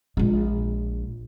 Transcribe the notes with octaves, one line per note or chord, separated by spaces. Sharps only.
A#1 G#3